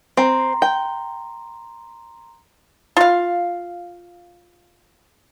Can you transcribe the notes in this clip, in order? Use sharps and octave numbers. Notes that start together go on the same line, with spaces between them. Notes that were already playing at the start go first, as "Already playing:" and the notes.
C4 A#5 C6
G5
F4 F5